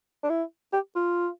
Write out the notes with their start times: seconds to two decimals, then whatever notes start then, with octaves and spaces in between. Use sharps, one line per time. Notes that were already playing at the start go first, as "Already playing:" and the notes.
0.23 D4
0.30 E4
0.73 G4
0.96 F4